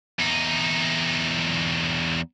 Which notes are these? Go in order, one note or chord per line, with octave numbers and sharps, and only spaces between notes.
E2 D#4